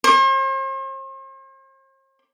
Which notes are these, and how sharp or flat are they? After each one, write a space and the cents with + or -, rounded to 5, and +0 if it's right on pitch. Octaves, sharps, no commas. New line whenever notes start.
C5 +45